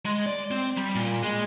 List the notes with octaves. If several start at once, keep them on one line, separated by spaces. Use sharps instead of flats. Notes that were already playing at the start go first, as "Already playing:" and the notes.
G#3
D5
C4
G3
A#2
G#3